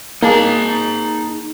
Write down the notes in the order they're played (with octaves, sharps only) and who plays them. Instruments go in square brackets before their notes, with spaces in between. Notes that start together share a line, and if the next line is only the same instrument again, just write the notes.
[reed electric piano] A#3 G#4 [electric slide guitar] D#4 A5